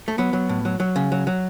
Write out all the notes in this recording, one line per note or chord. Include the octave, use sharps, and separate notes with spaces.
A3
F#3 B3
F#3
A2
F#3
F#3
C#3
F#3
F#3